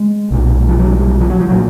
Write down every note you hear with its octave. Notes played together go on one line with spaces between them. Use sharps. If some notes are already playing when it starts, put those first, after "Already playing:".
Already playing: G#3
B1 A#2
F3
F#3
G3
F3
F#3
F3
A#2 F#3